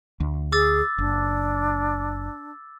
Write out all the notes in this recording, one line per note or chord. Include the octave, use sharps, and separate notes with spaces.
D2
G#4 D6 E6 A6
F#1 D4